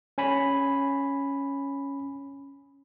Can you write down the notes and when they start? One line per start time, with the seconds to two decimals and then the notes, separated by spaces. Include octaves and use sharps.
0.18 C#4 G#5 B5